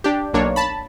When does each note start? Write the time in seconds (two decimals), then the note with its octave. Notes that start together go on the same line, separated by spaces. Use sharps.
0.04 D4 G4
0.34 B1 A#3 D4 C#5
0.56 A5 B5